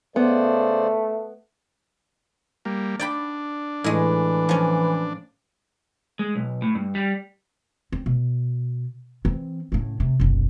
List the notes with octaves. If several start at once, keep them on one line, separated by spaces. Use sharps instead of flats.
C#3 A3 B3 C5 D5
G3 A#3
D4 D5 G5 B5
A2 E3 G#3
F3 C#4
G#3
B1
A2
G2
G3
C4
B2
E3 C4
A2 C#3
C3
F#1 B1